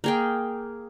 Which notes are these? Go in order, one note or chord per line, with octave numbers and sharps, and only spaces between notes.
A#3 G#4 G5